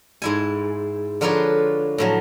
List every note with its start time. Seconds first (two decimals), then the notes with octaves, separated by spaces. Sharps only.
0.22 G#2 E4 G#5
1.21 D3 F3 F4 A#4 B4 C#5
1.98 A2 F3 F#3